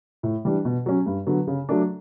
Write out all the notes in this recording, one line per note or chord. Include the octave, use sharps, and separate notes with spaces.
A2
E3 G3 D4
B2
F#3 C#4
G2
D3 F#3 B3
C#3
F#3 A3 D4